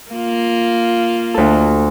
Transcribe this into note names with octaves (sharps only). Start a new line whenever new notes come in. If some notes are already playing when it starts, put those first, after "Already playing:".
A#3 F4
D2 A4